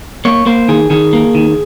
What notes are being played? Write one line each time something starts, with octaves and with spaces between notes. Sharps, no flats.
A#3 C#5
A#3 C5
D#3 G#4
D#3 G#4
A#3
D#3